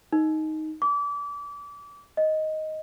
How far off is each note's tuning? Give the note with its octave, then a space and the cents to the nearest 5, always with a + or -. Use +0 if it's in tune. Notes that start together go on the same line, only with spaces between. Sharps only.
D#4 +5
D6 -30
D#5 +5